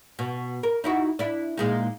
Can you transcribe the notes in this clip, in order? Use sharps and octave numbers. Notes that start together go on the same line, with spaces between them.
B2
A#4
D#4 E4 F#4
D4 E4
A#2 G#3 D#4